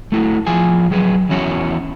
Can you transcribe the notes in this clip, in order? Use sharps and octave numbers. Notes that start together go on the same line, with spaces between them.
A3 E4 F#4
F3 F4 G#4 G#5
F#3 G#4 B4
E2 C#4 E4 F#4 C#5